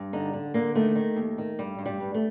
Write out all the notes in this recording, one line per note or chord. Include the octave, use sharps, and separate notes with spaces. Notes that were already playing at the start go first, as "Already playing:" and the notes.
Already playing: G2
D3 D#4
D3
D3 A#3
D#3 A3
D#3
D#2
D#3
G2 G3
G2
G3
G2
A3